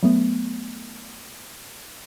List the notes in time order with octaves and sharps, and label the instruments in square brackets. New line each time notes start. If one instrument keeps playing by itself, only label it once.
[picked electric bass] F#3 A3 B3